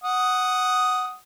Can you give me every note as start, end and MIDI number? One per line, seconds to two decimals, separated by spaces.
0.04 1.15 78
0.04 1.15 87